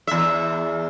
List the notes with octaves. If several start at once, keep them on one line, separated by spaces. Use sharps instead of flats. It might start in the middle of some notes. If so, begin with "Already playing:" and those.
E2 E5